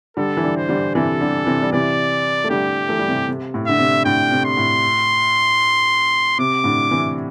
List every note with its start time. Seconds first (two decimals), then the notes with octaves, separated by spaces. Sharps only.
0.17 D3 G3 A4
0.37 E3
0.43 D3 G3
0.57 C5
0.69 D3 G3
0.95 C3 E3 A4
1.21 D3 G3
1.46 C3 E3
1.62 G3
1.72 C3 E3 D5
2.44 A3
2.50 D3 G3 G4
2.89 E3 A3
2.99 G3
3.08 C3 E3
3.29 C3
3.54 A2
3.67 D3 E5
3.79 C3
4.05 A2 D3 G5
4.31 C3
4.45 C6
4.57 A2
6.38 C3 D6
6.64 A2 D3
6.90 C3 E3